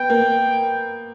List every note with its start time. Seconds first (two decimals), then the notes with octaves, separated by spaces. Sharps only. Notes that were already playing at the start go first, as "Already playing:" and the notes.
Already playing: B3 G5
0.10 A#3